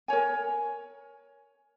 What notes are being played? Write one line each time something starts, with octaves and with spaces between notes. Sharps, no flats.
A#4 C#5 G#5